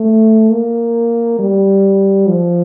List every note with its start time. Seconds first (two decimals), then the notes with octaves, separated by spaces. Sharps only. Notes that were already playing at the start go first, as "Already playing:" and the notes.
Already playing: A3
0.50 A#3
1.39 G3
2.28 F3